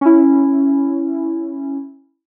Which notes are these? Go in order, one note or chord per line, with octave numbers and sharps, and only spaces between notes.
C#4 E4